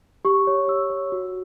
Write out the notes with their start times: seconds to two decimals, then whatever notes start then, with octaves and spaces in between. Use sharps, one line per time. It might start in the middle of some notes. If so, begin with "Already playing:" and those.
0.25 G4 C#6
0.47 C#5
0.68 G4 E6
0.90 C#5
1.12 F#4